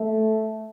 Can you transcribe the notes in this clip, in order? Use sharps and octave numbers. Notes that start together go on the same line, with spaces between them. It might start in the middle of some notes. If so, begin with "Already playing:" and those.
Already playing: A3